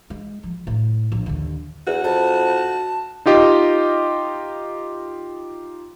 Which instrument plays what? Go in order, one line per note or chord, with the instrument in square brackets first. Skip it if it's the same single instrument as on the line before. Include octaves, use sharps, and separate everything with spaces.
[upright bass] G#3
F3
A2
A#1
D#2 D3
[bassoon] E2 [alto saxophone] F#4
[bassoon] F2 [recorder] A5
[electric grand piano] D#4 F4 G4 D#5